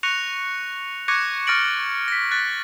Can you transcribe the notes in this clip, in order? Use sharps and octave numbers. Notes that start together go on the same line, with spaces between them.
C#6 F#6 A#6 C#7 F7
C#6 D6 F#6 G#6 A#6 C#7
C#6 F6 A6 A#6 D7 F#7
A#6 B6
F#6 A6 B6